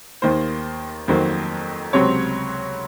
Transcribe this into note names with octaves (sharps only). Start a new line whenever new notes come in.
D#2 D#3 A#3 C5
F2 D#3 F#3 A#3 C5
C#2 C3 F#3 C4 C#5